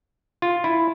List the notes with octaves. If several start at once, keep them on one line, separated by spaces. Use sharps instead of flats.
F4
E4